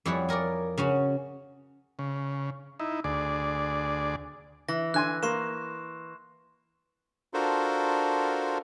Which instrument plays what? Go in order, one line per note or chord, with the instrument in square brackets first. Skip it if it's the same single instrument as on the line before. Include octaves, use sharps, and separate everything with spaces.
[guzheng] F2 G3 E4 G#4 C#5 F#5
G#4 A#4 C#5 D5
C#3 C#4 F#4
[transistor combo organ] C#3
D#4 E4
D2 G#4 D5
[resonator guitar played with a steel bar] E3 [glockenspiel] A#6
[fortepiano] D3 G#5 C6 [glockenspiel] F#6
[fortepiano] A#3 [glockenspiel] C6 C#6 E7
[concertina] D4 F4 F#4 A4 A#4 C5